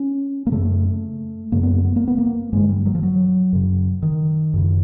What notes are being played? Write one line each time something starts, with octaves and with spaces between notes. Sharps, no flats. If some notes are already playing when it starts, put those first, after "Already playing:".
Already playing: C#4
A#3
F#2 C#3 A3
F#2 C#3 A#3
B3
A#3
B3
A#3
B3
A#3
G2 D3 G#3
G3
F#3
F3
F#3
F#2 C#3
D#3
F#2 C#3